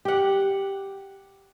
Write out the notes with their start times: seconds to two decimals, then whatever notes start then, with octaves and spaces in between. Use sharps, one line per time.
0.05 G4 F#5